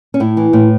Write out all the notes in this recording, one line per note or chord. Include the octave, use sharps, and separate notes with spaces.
C#4
A2 E4
E3
A2